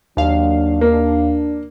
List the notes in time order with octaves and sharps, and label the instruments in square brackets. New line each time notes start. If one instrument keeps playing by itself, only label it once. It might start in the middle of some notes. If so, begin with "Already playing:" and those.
[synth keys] D#2 F5 [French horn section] F#3 D4
[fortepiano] A#3 [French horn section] D4